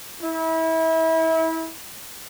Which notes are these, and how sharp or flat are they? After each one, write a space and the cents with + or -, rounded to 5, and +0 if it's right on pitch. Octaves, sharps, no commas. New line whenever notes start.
E4 -30